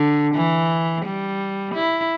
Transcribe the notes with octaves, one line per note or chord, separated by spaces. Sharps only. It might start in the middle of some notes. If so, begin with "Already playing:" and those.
Already playing: D3
E3
G3
E4